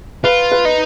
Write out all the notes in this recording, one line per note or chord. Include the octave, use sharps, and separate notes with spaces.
F4 B4
B4
D#4